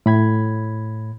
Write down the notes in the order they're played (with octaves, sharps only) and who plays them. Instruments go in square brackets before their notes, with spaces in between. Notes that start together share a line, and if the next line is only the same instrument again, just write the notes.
[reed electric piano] A2 B5 G#6